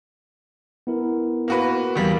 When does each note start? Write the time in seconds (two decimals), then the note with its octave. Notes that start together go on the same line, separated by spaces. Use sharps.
0.87 B3 E4 A#4
1.48 A#3 F#4 B4
1.96 E2 G3 A#3